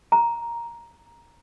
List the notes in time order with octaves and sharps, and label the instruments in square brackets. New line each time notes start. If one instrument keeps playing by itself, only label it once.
[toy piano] A#5